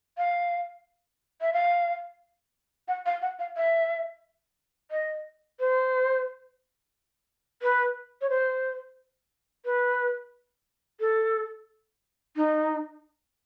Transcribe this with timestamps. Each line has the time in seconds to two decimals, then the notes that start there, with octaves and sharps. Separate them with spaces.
0.18 F5
1.41 E5
1.53 F5
2.88 F#5
3.06 F5
3.22 F#5
3.39 F5
3.57 E5
4.91 D#5
5.60 C5
7.62 B4
8.21 C#5
8.30 C5
9.65 B4
11.00 A4
12.36 D#4